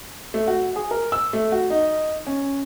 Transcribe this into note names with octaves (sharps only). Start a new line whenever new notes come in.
A3
F#4
G#4
A#4
E6
A3
F#4
D#4
C#4